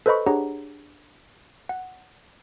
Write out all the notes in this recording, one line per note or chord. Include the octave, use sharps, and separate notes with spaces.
A4 B4 C5 D#5 B5 C#6
D4 G4 G#4 C#5 F#5 A#5
F#5